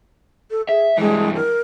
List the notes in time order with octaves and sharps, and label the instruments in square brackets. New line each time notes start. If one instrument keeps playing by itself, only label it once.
[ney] A4
[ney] G#4 [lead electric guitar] E5
[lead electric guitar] G2 E3 [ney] G#3
[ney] A#4